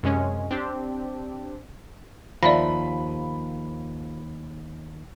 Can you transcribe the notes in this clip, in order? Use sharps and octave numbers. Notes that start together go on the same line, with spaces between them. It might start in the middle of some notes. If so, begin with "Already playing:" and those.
F#2 C3 G#3 C#4
C4 D4 G4
D#2 F3 D5 E5 B5 A#6